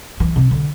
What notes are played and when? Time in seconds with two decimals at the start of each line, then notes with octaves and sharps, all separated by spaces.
0.20 E3
0.36 C3
0.51 D3